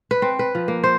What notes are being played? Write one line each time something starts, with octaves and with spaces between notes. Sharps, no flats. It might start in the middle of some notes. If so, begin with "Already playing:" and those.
B4
C4
B4
F3
A#3
C5